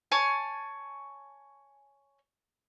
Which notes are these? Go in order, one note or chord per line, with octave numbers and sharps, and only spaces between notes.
C#5 G#5 A5